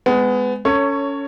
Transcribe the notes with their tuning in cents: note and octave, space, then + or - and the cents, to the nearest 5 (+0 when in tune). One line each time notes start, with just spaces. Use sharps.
G#3 +0 B3 +25
C#4 +15 A4 +40 C#5 +0